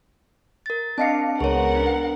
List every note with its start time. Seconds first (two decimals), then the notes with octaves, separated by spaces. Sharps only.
0.66 A#4 A6
0.98 C4 D4 D#5 F5 A5 C#7
1.40 C#2 B3 G#4 A#4 C#5 F#5
1.75 D4